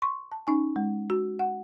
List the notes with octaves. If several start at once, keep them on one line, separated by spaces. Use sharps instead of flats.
C6 C#6
A5
C#4 D#4 G#5
G#3
F#4
F#5